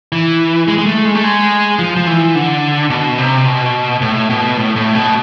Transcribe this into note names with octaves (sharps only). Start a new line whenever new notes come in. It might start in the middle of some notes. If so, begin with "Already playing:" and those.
E3
G#3
G#3
A3
G#3
A3
G#3
F3
F3
E3
D3
B2
C3
B2
A2
B2
A2
A2
B2